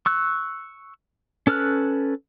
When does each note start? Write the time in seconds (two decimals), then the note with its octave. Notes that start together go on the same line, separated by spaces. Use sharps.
0.06 C#6 E6 F#6
1.47 C#4 A4 B4 F6 F#6